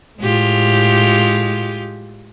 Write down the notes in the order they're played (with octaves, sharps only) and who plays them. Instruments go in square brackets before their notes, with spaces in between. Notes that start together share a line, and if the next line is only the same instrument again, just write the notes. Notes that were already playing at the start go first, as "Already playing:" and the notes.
[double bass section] A2 [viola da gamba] G#3 F4 G4